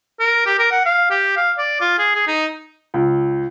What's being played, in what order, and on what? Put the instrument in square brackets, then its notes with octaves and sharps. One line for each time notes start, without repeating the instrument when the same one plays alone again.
[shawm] A#4
G4
A#4
F#5
F5
G4
F5
D5
F4
G#4
G#4
D#4
[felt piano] C#2